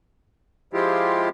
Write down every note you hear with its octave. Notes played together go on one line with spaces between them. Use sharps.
F3 G#3 E4 F4 G4